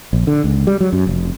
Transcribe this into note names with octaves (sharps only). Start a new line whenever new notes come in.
A#1
D3
C#2
G3
F#3
F#2
F1